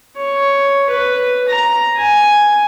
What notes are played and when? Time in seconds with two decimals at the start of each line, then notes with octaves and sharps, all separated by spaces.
0.17 C#5
0.90 B4
1.49 A#5
1.97 G#5